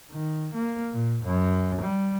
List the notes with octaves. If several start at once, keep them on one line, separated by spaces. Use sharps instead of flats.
D#3
A#3
A#2
F#2
G3